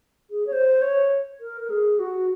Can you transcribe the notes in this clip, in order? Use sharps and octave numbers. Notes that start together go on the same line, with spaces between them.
G#4
C#5
C5
C#5
A#4
A#4
G#4
F#4